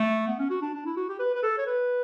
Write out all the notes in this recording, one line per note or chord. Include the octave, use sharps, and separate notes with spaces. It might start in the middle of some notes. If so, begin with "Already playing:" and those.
Already playing: A3
B3
C#4
F#4
D4
D4
E4
F#4
G4
B4
B4
A4
C#5
B4